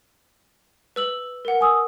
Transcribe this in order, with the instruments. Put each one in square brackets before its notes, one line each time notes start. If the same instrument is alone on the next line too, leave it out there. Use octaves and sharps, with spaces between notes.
[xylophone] B4 E6 F#7
A#4 F#5
[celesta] G#5 D#6 E6